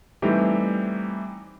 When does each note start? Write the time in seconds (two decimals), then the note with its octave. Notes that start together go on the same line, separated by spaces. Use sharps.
0.22 E3 G3 A3 C4 D#4 G4